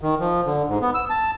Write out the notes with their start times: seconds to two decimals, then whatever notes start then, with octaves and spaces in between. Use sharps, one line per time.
0.01 D#3
0.20 F3
0.45 D3
0.68 G#2
0.81 B3
0.95 E6
1.10 A5